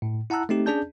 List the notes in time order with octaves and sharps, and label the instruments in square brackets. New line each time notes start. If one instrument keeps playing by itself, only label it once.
[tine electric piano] A2
E4 F#5 A5 A#5 E6 F#6
A3 C4 D#4 G4
C#4 D4 G#4 D5 A5 G6